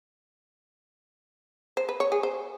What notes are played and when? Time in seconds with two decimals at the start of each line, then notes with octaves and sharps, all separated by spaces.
1.77 C5
1.89 B4
2.00 C#5
2.12 G#4
2.23 C5